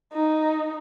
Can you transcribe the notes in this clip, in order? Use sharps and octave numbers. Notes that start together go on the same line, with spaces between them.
D#4